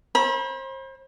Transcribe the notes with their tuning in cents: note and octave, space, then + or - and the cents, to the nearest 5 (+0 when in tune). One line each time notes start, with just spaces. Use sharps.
C5 +35 B5 -35